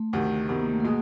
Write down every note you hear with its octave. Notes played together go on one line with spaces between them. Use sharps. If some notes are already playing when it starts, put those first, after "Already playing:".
Already playing: A3
D2 C3 D#3
D2 C3 D#3 B3
A#3
A3
B2 G#3 A#3